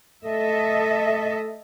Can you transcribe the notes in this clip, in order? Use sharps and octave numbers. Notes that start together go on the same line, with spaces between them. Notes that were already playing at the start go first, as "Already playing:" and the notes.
A3 A4 D#5 E5